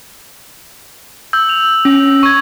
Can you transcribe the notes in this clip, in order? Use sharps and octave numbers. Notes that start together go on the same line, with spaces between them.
E6 G6
F7
C#4
C#6 G#6